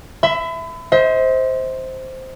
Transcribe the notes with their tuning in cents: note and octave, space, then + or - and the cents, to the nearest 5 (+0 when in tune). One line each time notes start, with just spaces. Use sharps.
E5 +0 B5 +35
C5 +0 D#5 +45